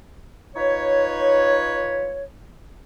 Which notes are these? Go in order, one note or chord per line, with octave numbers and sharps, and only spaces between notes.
D#4 F4 B4 C#5